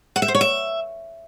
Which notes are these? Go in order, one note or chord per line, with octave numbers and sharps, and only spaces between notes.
F#5
E5
C5
C#5
E5